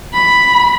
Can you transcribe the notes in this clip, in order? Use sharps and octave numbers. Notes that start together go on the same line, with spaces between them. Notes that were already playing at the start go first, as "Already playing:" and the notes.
B5